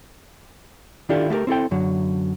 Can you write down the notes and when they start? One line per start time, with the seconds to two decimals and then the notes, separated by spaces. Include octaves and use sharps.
1.09 D#3 D4 E4 F4 G4 A4
1.30 A3 F#4 G4 A#4
1.47 C4 E4 A4 G5
1.71 F#2 D3 F#3